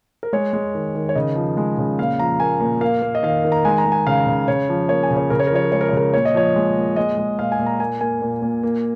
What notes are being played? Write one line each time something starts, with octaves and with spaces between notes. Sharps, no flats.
A#4
G#3 C#5
G#3
D#3
D#3
C#5
C#3 D#5
F3
G#3
C#3
A#2 F5
F3 A#5
A#3 G#5
A#2
A#3 F5
A#3
D#5
D#3 F5
D#3
A#5
G#3 G#5
A#5
G#3
G#5
C#3 F5
C#3
C#3 C#5
F3
A#3 C#5
G#5
C#3
C#5
C#3 A#4
C#5
A#4
F3 C#5
A#4
G#3 C#5
A#4
C#5
C#3 A#4
A#2 C#5
D#5
F3 C#5
G#3
A#2
G#3 D#5
G#3
A#2 F5
G#5
A#2
A#5
A#3 G#5
A#3 G#5
A#2
A#2
A#3